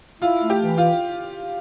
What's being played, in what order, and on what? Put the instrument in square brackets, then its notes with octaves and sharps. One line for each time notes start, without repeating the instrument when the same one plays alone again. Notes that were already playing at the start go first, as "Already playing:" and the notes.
[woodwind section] E4 [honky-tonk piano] F4
[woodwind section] A3
[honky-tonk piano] G4
[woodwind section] E3
[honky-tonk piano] F4